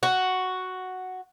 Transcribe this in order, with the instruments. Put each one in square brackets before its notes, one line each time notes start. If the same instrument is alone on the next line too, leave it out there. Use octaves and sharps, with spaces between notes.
[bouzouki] F#4